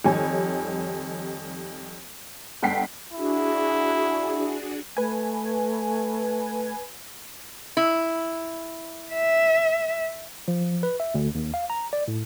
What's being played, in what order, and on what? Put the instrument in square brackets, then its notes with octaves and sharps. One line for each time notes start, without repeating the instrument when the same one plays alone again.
[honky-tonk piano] F2 D#3 G3 C#5 G#5
G1 F#5 G5 B6 C7
[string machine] D4 F#4 G#4 [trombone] E4
[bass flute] A3 [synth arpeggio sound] B4 G#5
[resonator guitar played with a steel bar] E4
[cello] E5
[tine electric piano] F3
B4
E5
D2
D#2
F5
A#5
D5
A2